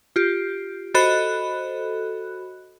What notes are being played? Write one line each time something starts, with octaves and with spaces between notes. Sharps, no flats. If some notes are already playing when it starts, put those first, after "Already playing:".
F4 G4
F#4 A4 C5 D#5 B5 F#6